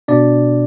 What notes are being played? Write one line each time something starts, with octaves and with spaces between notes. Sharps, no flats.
B2 D4 D5